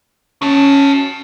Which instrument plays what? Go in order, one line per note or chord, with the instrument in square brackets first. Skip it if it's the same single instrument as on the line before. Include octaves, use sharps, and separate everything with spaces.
[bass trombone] C#4 [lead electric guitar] F#4 A5